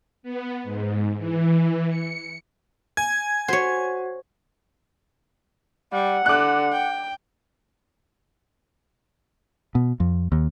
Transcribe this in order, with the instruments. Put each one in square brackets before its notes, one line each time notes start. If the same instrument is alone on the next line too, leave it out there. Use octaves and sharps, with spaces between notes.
[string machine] B3
G#2
E3
C#7
[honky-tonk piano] G#5 [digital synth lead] G#6
[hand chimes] F#4 F#5 [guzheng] C5 C#5
[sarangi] G3 [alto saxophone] F#5
[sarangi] D3 [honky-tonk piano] D6 F#6
[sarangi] G5
[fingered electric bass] B2
F2
D#2